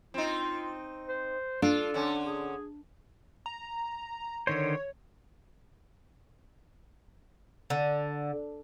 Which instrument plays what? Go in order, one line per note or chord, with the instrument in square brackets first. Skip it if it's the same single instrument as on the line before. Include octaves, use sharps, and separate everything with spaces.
[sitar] C4 D#4 [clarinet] F4
[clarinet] C5
[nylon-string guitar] D4 [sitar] F4 [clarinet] A4
[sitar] D3 C#4
[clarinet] G#4
[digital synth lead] A#5
[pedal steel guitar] D3 D#3 C5 [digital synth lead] C#5
[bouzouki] D3